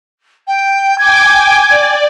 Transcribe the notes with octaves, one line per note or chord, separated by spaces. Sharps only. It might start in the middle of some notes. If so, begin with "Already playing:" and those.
G5
G5 G#5 D6 G#6
D5